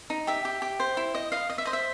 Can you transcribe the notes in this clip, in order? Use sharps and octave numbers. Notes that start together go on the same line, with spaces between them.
D#4
G4 E5
G4
G4
C5
E4
D#5
D#5 F5
D#5
E5
C5 D#5
E5